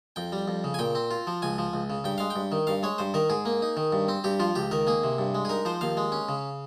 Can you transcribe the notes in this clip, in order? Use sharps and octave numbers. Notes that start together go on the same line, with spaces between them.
F2 G5
G3
F2
C#3
G#5
A#2 G5
C4
F4
F3
C#2 G#5
F3
C#2
C#3
G2 G5
G#3 F5
G5
G2
D#3
G2 F5
G#3 C#5
G2 C5
D#3 A#4
G#2 G#4
A#3
D#4
D#3
G2
C4
G2 G4
F3 F4
C#2 G4
D#3 A#4
A#3 G#4
C3
G2
G#3
G#4
D#4 A#4
F3 C5
D#2 F5
G#3
C#4
C#3